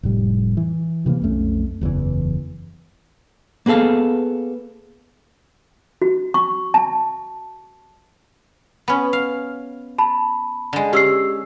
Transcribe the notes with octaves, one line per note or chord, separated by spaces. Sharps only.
F1 A2 G3
E3
C3 E3 G#3 A#3
B1 F2 A3 C#4
F#1 E2 A2 E3
A#3 B3 G#4 A4 F5
F#4
C#6
A5
B3 C#4
F5
A5 B5
D3 G#3
C#4 G4 E6 C7